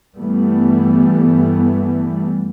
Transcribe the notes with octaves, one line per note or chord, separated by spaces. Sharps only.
G2 E3 G3 A3 B3